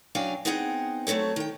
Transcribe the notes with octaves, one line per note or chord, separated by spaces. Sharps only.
F#2 F#3 D4 F5 G5 G#5
B3 C4 D#4 G#4 F#5 G5
F#3 A3 C4 A4 C#5
D#3 G5